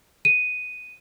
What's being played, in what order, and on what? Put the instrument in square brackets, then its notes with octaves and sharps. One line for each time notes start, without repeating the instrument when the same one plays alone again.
[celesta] D#7